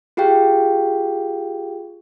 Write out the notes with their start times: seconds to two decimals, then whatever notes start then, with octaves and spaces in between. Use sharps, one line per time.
0.17 F4 G4 G#4 F5 G5